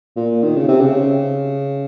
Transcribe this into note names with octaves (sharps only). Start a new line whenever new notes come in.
A#2
D#3
C#3
C3
C#3